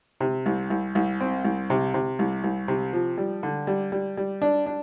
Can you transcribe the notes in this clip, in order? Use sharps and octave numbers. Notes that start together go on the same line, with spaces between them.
C3
C2
C2
C2
C4
C2
C3
C3
C2
C2
C3
F3
G3
D3
G3
G3
G3
D4
D4